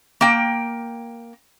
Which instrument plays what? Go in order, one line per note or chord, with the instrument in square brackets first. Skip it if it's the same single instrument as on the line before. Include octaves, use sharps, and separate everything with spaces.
[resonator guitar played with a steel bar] A#3 G5